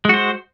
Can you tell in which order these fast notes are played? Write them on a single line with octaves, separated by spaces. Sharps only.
G#3 F#4 C5